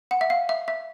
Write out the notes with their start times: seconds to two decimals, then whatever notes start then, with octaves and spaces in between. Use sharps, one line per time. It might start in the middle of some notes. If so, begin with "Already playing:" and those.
0.11 F#5
0.21 E5
0.30 F5
0.49 E5
0.68 E5